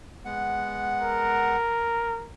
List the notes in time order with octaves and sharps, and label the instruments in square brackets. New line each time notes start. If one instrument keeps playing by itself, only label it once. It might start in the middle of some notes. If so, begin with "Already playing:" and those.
[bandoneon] G#3 B3 F#5
[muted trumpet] A#4